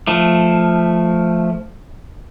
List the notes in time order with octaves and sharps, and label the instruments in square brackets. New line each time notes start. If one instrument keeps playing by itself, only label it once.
[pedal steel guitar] F3 A3